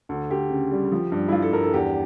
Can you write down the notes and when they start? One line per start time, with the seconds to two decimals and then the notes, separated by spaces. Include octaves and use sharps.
0.09 D2 A4
0.31 D2 G4
0.50 C#3
0.72 G3
0.92 F3
1.12 G2
1.28 E4
1.32 F3 F4
1.42 A4
1.52 G2 A#4
1.64 A4
1.74 E2 G4